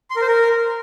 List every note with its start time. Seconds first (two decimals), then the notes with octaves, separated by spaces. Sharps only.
0.10 C6
0.16 A#4
0.22 C5
0.28 A#4